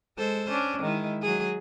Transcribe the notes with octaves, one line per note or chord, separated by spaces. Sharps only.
G#3 A4 C5
C#4 D4
D#3 G#3 E4
F#3 G#4